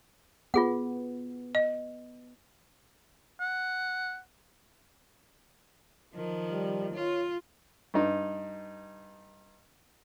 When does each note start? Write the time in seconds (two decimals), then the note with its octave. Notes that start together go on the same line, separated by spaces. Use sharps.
0.54 B3 F4 G#4 F#5
1.55 D#5
3.40 F#5
6.15 D#3 F3
6.52 G3
6.94 F4 C#5
7.94 G2 D#4